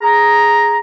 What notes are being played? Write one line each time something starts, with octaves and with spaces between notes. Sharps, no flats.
G#4 A#5